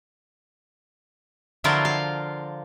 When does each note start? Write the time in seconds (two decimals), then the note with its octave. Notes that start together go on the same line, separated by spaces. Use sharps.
1.64 D3 F3 F#3 E4 F4 A#4
1.85 F5